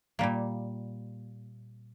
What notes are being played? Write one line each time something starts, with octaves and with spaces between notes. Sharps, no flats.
A#2 G3 A#3